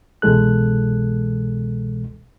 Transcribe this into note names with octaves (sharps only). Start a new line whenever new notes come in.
C2 B2 E3 G#3 A4 F#6